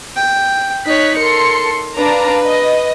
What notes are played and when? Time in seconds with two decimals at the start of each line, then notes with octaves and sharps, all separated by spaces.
0.16 G5
0.86 D#4 C#5 F#6 B6
1.18 A4 A#4 C6 C#7
1.96 D4 B4 F5 A#5
2.45 D#5